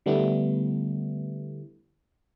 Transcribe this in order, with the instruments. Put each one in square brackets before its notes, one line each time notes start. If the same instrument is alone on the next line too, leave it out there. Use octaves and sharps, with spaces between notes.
[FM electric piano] D3 G3 A3 B3 E4